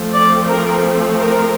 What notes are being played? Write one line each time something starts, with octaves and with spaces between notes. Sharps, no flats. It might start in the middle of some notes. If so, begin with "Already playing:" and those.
Already playing: F3 A3 C4
D5
A#4
A#4